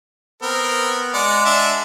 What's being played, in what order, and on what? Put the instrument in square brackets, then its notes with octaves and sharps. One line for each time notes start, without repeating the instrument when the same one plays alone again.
[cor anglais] B3 [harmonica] C4 A#4
[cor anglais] G#3 [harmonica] D5 F#5
[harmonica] D4 E5